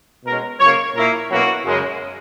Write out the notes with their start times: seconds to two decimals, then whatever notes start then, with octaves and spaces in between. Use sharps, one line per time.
0.24 B2 G#3 C#4 A#4
0.60 C#3 F#3 A#3 C#5
0.94 A#2 A#3 E4 A#4
1.30 B2 F#3 A#3 C#4 E4 F#4
1.65 F#2 C#3 G#3